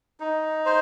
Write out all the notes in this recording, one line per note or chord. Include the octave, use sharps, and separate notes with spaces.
D#4
C5